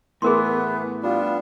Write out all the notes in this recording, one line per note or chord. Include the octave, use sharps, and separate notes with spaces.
A2 E3 B3 G#4 A#4 C6
G3 B3 D4 F4